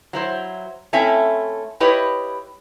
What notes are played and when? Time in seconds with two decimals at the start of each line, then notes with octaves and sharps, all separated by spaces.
0.13 F#3 E4 C5
0.93 A3 C4 C#4 E4 E5 G#5
1.80 E4 G4 B4 C#5 D#5